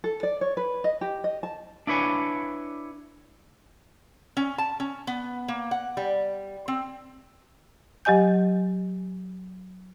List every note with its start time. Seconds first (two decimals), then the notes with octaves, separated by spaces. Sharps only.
0.04 A4
0.23 D5
0.41 C#5
0.57 B4
0.84 D#5
1.01 G4
1.24 D#5
1.43 A5
1.87 D4 E4 B4 C#5 G#5
4.37 C#4
4.58 A5
4.80 C#4
5.07 B3
5.48 A#3
5.71 F#5
5.97 G3
6.68 C4
8.05 F#3 G4 D#5 G#5 G6